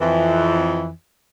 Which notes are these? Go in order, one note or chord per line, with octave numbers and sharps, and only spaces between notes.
F2 E3